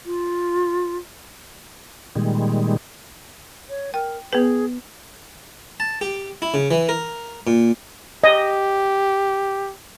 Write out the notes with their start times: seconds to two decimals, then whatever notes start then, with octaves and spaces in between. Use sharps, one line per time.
0.06 F4
2.15 A#2 D#3 G3 G#3
3.69 C#5
3.94 A#4 G5
4.33 B3 G#4 B4
5.80 A5
6.01 G4
6.42 E4
6.54 C#3
6.71 E3
6.89 A#4
7.47 A#2
8.24 G4 D#5